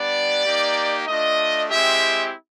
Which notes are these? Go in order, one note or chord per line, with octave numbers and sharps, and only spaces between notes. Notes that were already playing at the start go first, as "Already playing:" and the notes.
Already playing: G3 B3 D4 D5
A#3 D#4 G4
A3 D4 F4 D#5
G#3 C4 E4 G4 E5